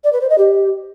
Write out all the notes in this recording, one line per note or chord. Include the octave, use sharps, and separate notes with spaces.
D5
B4
C5
D#5
G4